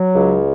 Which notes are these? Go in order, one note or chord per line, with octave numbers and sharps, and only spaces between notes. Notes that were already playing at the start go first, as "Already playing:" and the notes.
Already playing: F#3
C#2